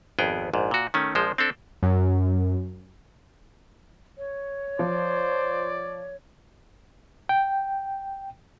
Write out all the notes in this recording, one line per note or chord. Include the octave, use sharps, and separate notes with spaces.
G#1 F2 B3 G#4 G5
A#1 G#2
A#2 F#4
D#3 A3 C#4
A#1 F3 G#3 C5
C4 D4 A4
F#2
C#5
F3 C5 D5
G5